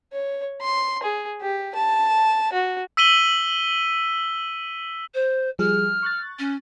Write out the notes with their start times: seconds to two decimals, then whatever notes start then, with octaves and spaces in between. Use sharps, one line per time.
0.12 C#5
0.61 C6
1.02 G#4
1.41 G4
1.75 A5
2.52 F#4
2.97 E6 B6 D#7 F#7 G7
5.14 C5
5.59 F3 G3 G#4 F6
6.03 C#6 F#6 A6
6.39 C#4